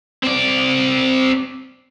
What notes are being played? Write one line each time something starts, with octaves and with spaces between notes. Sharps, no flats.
C4 D5